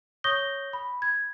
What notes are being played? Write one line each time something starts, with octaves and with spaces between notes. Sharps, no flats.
C#5 C#6 D#6 G6 A#6 G7
B5
G#6